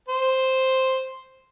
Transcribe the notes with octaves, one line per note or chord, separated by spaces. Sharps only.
C5